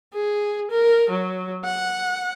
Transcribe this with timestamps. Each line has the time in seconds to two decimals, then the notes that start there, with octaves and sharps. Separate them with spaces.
0.13 G#4
0.71 A#4
1.09 F#3
1.65 F#5